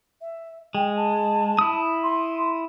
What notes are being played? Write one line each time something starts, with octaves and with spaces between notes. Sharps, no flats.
E5
G#3 G5
A5
E4 D#6
C6